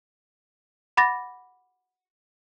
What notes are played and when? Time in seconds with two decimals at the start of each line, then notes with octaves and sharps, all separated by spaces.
0.97 F#5 B5 D6 A6 A#6